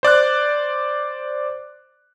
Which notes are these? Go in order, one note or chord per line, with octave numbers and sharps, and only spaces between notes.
C5 D5 D6 F#6